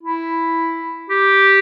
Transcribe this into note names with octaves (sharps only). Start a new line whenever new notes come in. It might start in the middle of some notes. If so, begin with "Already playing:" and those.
E4
G4